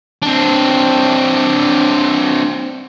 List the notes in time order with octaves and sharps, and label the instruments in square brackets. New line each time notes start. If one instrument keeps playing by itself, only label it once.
[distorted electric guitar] C4 D4